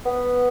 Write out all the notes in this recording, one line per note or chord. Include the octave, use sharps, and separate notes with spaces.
B3